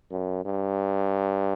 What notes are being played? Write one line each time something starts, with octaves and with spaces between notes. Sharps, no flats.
F#2
G2